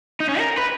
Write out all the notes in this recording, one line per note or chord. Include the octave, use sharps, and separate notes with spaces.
D#4
C#4
A#4
B4